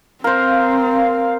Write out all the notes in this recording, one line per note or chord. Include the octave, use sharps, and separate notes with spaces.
C4 A#4 C5 F5